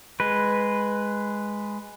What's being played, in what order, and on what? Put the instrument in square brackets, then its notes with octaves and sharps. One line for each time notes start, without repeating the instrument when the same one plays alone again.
[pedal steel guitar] G#3 B4